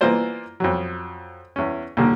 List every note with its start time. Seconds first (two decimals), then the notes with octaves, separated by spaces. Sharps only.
0.01 E3 A#3 B3 F4 C5 D5
0.60 F2 F#3
1.56 E2 C#4
1.97 D#2 A#2 D3 A#3